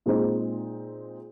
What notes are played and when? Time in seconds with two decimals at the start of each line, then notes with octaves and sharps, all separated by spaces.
0.06 A#2 G#3 C4 D#4 G#4